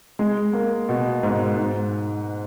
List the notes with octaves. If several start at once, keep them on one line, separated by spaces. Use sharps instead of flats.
G#3
A#3
B2
G#2
G#2